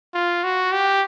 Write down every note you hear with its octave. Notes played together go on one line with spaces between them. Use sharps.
F4
F#4
G4